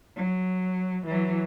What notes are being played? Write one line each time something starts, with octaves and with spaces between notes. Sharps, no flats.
F#3
E3 F#3